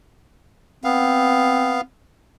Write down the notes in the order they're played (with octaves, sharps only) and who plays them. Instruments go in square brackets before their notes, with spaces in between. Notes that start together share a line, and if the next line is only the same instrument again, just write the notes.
[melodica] B3 F5 [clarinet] C4